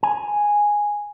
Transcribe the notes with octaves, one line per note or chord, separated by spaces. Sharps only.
G#5